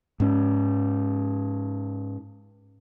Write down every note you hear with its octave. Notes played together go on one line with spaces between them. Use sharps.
G#2 C#4